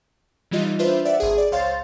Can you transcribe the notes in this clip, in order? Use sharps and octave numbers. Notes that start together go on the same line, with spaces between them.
E3 G3 D#4 F4 D#5
D4 F4 B4 C5 E5
D5 E5 F#5
G#1 G#4
D5
C#2 C5 C#5 F5 C6 A6